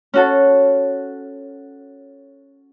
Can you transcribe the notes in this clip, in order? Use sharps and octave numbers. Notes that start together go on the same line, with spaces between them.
C#4 F#4 A4